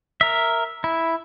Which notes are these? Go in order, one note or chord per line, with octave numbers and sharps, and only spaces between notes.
A#4 E5
E4